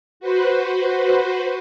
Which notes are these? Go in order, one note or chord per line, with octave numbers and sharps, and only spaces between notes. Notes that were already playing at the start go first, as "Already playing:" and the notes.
F#4 B4 C5